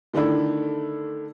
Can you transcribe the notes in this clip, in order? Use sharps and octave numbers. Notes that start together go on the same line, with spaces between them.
D3 D#3 A3 D4 E4